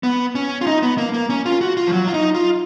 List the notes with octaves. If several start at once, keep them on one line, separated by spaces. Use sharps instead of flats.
B3
C#4
F4
D#4
B3
A#3
A#3
C#4
F4
F#4
F4
F3
F#3
F4
D#4
F4